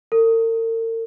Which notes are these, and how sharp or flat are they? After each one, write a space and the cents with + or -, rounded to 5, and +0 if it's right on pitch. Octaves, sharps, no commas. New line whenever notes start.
A#4 -45